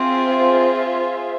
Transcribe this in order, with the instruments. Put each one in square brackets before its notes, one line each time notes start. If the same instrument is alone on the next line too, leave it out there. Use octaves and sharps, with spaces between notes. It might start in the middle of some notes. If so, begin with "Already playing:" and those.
Already playing: [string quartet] C4 [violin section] F4 G#4 C5 E5